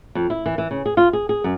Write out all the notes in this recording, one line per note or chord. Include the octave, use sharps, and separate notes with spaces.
F2
E4
E3
E3
C#3
G#4
F4
G#4
G#4
F#2